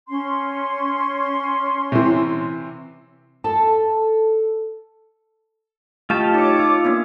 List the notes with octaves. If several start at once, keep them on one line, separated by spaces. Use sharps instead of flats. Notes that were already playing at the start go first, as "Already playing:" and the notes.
C#4 C6
C3 E3
A4 A5
A3 F4 G4 A5 C#6 F6
D#4 C#5 D6 C#7
F4 E6
A#3 B3 D4